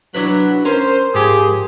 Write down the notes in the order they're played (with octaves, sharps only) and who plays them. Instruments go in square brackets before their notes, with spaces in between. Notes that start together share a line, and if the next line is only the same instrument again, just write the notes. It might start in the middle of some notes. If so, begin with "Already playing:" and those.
[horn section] F#3 [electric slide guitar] D4 E4 B4
[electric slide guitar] C#4 [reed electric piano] A#4 C6 [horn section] C5
[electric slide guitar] G#2 [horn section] F3 G4 G#4